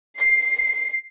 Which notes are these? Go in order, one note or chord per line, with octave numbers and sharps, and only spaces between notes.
C7